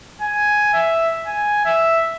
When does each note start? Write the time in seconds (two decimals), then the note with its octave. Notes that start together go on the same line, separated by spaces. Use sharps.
0.21 G#5
0.74 E5
1.27 G#5
1.65 E5